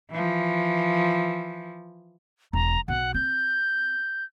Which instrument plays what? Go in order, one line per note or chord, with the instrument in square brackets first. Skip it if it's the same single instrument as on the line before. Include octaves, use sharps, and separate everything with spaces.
[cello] E3 F3
[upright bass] E1 [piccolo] A#5
[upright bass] B1 B3 [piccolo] F#5
[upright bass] C4 [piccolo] G6